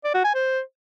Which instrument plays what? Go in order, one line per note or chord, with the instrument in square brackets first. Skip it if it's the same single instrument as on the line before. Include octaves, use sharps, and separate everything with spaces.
[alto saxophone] D5
F#4
G#5
C5